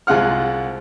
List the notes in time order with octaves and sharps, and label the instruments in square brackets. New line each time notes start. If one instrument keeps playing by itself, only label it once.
[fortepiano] C2 G#3 F4 F#5 F6